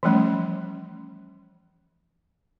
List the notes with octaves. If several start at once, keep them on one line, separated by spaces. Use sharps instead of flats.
E3 F3 G3 A3 C#4